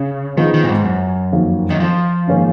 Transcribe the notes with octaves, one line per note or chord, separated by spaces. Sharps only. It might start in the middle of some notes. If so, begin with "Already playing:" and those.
Already playing: C#3
D#3 F3 B3 D#4 G#4
D#3
A#2
G#2
F#2
F2 D#3 F#3 A#3
D#3
F3
G#2 D#3 A#3 C#4